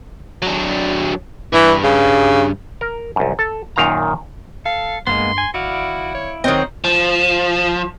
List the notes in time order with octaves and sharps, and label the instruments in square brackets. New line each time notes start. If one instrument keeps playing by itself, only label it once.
[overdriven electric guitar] F#3 D4
[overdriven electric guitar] G2 [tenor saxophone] E3
[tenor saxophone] C#3
[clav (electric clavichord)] A#4
C2 F#2
A4
F#2 A#2 D#3 F5 A#5
[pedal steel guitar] A4 [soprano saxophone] F5
[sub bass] G2 [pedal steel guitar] G#3 A#3 B3 [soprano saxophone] C6
[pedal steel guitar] G#5
[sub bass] G#1 [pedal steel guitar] E4 D5 F5 [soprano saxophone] F#4
[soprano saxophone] C#5
[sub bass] C#2 [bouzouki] D#3 F#3 C4 [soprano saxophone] D#5
[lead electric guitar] F3